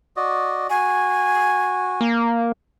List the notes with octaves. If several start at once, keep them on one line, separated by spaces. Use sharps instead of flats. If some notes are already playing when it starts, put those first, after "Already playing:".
F#4 D5 D#5
F#4 G#5
A#3